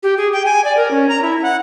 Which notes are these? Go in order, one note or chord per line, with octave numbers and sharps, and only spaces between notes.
G4
G#4
G5
G#5
D5
A#4
C#4
A#5
E4
F#5